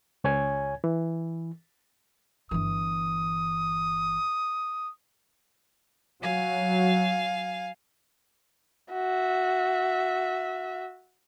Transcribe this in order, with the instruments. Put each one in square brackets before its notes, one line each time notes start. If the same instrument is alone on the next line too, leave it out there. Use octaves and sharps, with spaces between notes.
[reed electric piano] C#2 C#5 G#5 G#6
E3
[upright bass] G1 E3 [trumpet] D#6
[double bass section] F#3 [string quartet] F5 G#5
[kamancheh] F#4 E5